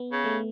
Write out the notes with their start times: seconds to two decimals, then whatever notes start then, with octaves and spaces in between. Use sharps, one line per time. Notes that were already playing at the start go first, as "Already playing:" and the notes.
Already playing: B3
0.12 C#3
0.24 A3